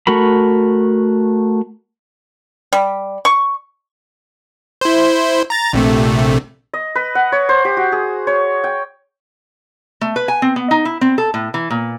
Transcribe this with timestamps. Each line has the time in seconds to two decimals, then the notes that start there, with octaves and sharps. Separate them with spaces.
0.07 A3 F#4 A#4 B5
2.73 G3
3.25 C#6
4.81 E4 C5
5.50 A#5 A6
5.73 A#1 C3 A3
6.73 D#5
6.95 B4
7.15 F#5
7.32 C#5
7.49 C5
7.65 G4
7.77 F#4
7.92 G#4
8.27 C#5
8.64 G5
10.01 A3
10.16 B4
10.28 G#5
10.42 C4
10.56 B3
10.71 D#4
10.85 E4
11.01 C4
11.18 A4
11.34 A2
11.54 E3
11.70 A#2